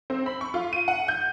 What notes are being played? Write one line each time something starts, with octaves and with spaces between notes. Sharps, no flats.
C4
B5
C#6
F4
D#7
F#5
G6